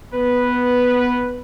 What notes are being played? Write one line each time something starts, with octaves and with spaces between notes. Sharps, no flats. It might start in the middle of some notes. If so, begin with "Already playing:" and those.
B3 B4